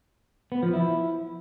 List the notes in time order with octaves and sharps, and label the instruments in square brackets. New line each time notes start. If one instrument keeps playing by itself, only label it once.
[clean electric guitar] B3
F3
E4